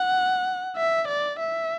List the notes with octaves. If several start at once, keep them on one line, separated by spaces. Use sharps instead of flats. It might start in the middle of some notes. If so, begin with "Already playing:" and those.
Already playing: F#5
E5
D5
E5